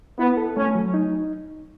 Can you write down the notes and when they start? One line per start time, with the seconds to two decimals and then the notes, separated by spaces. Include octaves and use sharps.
0.19 B3 E4
0.37 A4
0.56 A3 C#4
0.75 F#3
0.94 D#4